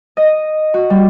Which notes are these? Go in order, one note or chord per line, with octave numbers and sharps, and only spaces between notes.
D#5
F#4
G3